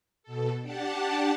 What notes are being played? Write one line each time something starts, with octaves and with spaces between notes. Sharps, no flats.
B2 A4
D4 G4 F#5 A5